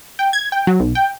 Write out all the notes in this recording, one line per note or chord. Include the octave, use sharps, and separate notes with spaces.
G5
G#6
G5
F#3
B1
G5